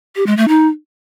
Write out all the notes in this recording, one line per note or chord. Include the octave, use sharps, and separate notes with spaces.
G4
G#3
A3
D#4